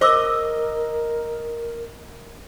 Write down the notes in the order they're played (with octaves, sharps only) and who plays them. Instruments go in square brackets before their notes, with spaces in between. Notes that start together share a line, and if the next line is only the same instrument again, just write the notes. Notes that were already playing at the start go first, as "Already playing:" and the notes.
[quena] A#4 [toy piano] C5 D6 E6 [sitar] D#5